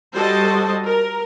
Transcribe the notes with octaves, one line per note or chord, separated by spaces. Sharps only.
G3 F#4 A4 C5 D#5 A5
A#4